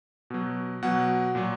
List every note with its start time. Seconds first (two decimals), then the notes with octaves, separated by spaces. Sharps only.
0.30 B2 F#3
0.82 B2 F#3 F#5
1.35 A#2 F#3